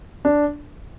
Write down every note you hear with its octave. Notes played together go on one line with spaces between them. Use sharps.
D4